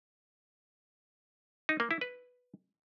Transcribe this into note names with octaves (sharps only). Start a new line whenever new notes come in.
D#4
A#3
E4
B4